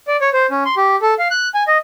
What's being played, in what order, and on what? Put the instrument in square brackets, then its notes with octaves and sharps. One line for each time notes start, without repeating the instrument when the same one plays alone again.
[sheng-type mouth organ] D5
C#5
C5
C#4
C6
G4
A4
F5
F#6
G#5
D#5